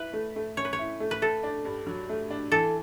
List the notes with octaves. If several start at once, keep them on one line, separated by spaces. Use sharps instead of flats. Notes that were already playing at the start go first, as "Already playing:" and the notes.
Already playing: E4 B4
A3
A3
C#4 C#5
B4
C#5
E4
A3
B4
A3 A4
D4
G2
F#3
A3
D4
E3 A4